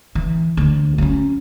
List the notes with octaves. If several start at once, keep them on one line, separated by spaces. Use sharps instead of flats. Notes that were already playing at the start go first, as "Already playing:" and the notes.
E3
D2
F#3 C#4